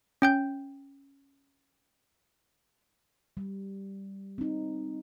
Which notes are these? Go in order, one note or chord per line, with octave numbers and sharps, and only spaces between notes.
C#4 G5 G6
G3
C4 D#4